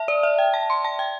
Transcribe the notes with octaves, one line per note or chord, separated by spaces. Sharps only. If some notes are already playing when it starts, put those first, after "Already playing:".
Already playing: E5 A5
D5
E5
G5
A5
C6
A5
G5